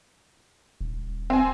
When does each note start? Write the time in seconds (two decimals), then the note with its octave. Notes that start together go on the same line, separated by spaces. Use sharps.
0.81 D#1
1.30 C4 G#5